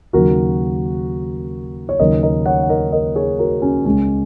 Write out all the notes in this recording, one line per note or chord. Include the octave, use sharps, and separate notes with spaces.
D#2 C#3 F#3 F#4 A#4
C#5
D#2 C#3 F#3 A#3 A#4 D#5
A#4 D#5
C#5 F#5
F#5
A#4 D#5
A#4 D#5
G#4 C#5
F#4 A#4
C#4 F#4
C#2 C#3 G#3 C#4